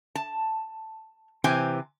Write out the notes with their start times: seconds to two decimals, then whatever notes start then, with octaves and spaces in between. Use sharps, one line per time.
0.15 A5
1.44 C3 E3 C5 G5 G#5